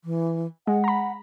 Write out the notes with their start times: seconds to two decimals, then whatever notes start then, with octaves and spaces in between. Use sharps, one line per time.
0.04 E3
0.67 G#3 F#5
0.84 A#5 B5